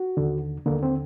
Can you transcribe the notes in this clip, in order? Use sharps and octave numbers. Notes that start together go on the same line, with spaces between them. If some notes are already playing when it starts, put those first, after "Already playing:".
Already playing: F#4
D#2 D3
D#2 D3 A#3
C4